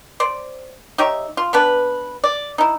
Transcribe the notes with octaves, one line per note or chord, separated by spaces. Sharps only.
C5 D5
D#4 G4 C#5 E5
F4
B3 D4 B4
D5
D#4 E4